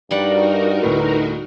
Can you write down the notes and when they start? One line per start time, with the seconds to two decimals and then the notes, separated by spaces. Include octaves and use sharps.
0.11 G2 G3 D#4 F#4 A#4 D5 F#5
0.83 D2 A2 B4